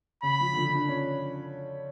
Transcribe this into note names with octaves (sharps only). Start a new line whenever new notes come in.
C#3 B5
F3
D3
F3
D4
C#4